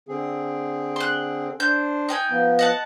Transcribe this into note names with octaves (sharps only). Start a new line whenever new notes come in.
D3 C4 G#4
C6 F#6
D4 C5 G6
D#4 G5 G#5
F3 B3
D#5 F#5 A5